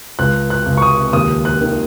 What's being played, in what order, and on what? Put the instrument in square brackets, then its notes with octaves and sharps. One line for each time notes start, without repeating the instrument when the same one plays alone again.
[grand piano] C#2 F#6
F#6
C#2
C#6
D#6
D#2 D#6
F#6
D#3